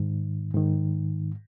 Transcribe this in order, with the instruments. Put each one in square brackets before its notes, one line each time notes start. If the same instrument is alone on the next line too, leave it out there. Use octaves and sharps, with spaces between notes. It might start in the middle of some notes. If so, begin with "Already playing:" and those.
Already playing: [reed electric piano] G#2 D#3
G#2 D#3